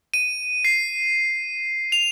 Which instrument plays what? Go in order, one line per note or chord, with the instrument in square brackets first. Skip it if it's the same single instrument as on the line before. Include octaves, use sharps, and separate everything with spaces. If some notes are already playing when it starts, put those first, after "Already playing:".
[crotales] D#7
C7
F7